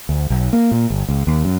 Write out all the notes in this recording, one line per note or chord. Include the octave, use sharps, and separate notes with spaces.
D2
B1
A#3
A#2
G1
C#2
D#2
F#2